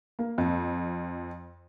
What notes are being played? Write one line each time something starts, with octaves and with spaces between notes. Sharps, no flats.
A#3
F2